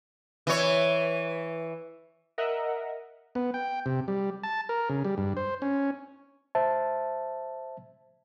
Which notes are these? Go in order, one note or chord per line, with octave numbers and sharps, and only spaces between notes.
E3 C#5
A#4 D#5 E5 F#5
B3
G5
C3
G3
A5
A#4
C#3
G3
G2
C5
C#4
C5 E5 A5